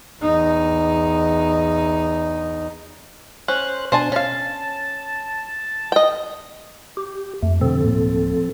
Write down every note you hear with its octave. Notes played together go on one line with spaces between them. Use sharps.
E2 D#4
C#4 C5 F#6
B2 D4 C5 G#5 A5
C#4 F5 A5
D#5 G5
G4
F2 A3
B2 D3 F3 C4 A4
D1 A2 A#3